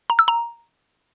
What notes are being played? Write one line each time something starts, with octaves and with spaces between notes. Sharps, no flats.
A#5
E6
A#5